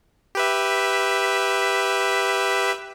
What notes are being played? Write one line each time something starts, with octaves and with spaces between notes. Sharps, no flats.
G4 B4 E5